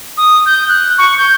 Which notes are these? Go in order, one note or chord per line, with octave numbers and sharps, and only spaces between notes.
D#6
G6
F#6
C#6
G6